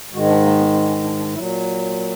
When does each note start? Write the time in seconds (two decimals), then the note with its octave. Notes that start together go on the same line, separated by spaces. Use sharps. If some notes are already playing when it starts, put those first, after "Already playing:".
0.13 G#2 D#3 G#3 F#4
0.28 D4
0.44 A#3
0.58 B3
0.74 C4
0.82 D4
0.89 C#4
1.04 D4
1.18 D4
1.33 A#2 F#3 E4